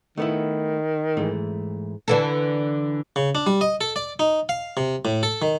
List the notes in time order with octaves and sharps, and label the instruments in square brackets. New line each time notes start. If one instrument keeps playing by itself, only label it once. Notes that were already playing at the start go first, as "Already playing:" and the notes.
[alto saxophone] D#3 [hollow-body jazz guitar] A3 B3 E4
[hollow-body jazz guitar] G#2 E3 A3
[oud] D3 E3 A4
[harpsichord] C#3
D4
G3
D#5
A4
D5
D#4
F5
C3
A2
A4
D#3